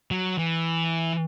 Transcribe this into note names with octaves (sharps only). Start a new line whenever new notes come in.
F#3
E3